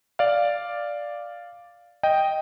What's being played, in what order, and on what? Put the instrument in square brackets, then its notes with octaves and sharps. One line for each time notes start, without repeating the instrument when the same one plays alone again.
[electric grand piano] D5 F5
D#5 G5